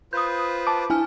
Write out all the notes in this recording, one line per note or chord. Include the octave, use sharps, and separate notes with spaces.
F4 B4 C5 D#6 G6
A5 D6
D4 E4 G#5 F6